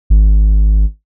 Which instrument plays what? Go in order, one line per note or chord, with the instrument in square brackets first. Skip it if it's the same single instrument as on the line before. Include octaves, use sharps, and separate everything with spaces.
[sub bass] G#1